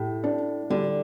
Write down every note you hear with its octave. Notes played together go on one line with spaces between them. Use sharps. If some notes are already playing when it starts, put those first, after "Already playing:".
Already playing: A2 G4
D4
D3 G3